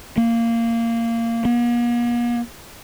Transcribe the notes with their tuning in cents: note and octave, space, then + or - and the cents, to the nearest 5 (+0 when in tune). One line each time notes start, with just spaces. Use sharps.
A#3 -15
A#3 +45